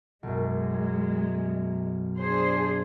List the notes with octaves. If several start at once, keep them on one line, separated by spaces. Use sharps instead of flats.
B1 F#2 G#3
D4 G#4 C5